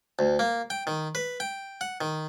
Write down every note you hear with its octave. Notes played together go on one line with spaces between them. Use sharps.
D2
A#3
G5
D#3
B4
G5
F#5
D#3